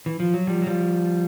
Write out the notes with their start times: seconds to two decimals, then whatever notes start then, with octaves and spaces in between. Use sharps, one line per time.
0.06 E3
0.20 F3
0.34 F#3
0.47 F3 G3
0.62 F#3
0.66 F3 G3